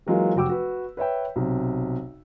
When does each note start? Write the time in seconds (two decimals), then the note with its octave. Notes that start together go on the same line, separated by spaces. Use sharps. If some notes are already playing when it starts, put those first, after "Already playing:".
0.07 E3 F#3 G#3 A#3 F4
0.36 F1 F#4 G5 D6 E6
0.49 F#4 B4
0.97 B4 C#5 E5 G5
1.36 B1 C3